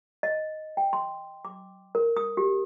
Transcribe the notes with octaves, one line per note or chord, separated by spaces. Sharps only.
D#5
G5
C6
D6
A#4
D#6
G4